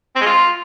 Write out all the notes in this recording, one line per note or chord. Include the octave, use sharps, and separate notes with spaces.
C4
G#3
F4